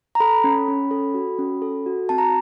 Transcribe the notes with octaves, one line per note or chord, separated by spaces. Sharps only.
A#5
A4 B5
C#4
C#4
A4
F#4
C#4
A4
F#4
C4 A5
A#5